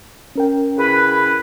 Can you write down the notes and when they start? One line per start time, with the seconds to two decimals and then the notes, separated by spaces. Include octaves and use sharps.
0.36 C#4 A#4 G5
0.77 C#3 E4 B4